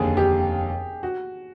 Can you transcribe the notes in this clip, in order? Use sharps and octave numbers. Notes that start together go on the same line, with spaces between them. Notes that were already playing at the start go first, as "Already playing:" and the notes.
Already playing: F1 D#2 D3 G#4
G4
F#4